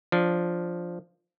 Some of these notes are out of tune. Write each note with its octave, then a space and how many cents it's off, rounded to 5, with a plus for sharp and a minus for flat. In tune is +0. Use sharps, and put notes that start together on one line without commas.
F3 +0 D4 +0